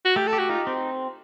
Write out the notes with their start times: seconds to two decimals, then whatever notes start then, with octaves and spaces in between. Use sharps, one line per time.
0.05 F#4
0.16 A3 G4
0.28 A4
0.33 G4
0.39 F#4
0.49 D#4 F4
0.67 C4